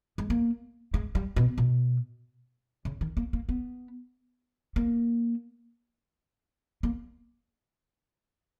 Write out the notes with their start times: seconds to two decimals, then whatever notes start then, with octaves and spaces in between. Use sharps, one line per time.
0.18 G#3
0.30 A#3
0.94 G#3
1.15 G3
1.36 B2
1.58 B2
2.85 C#3
3.01 D#3
3.17 A#3
3.33 A#3
3.49 B3
4.76 A#3
6.83 A#3